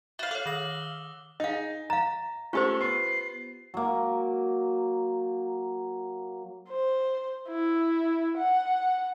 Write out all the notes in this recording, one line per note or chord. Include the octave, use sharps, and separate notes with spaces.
F#4 E5 F5 G6 F#7
A4 C#5 F5 F#6
D#3 D6 D#6 A#6 F#7
E6 G7
D#4 G#4 D#5 F5
F5 A#5 A6
A3 C#4 F4 G4 A4 C5 C#6
B3 C6 C7
F#3 A#3
C5
E4
F#5